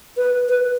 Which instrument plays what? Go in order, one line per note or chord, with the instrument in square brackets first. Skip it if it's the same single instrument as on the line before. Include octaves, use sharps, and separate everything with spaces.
[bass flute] B4
B4